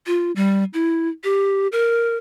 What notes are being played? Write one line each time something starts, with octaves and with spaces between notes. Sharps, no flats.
F4
G3
E4
G4
A#4